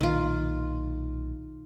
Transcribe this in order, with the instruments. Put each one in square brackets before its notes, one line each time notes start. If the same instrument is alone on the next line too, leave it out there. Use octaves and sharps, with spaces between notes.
[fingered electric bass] B1 A#2 [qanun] D#3 F4